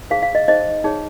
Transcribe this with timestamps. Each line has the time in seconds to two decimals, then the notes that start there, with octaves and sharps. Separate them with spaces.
0.10 D#4 G#4 C5 F5
0.23 F5
0.35 D#5
0.48 D#4 G#4 C5 D#5
0.84 D#4 G#4 C#5